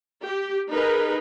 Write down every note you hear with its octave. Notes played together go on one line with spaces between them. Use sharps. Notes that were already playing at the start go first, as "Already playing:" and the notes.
G4
D#4 G#4 A#4 B4